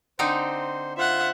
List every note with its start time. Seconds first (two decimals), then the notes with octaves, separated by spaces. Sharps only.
0.19 D3 C4 D#4 C5
0.97 F4 C5 E5 F#5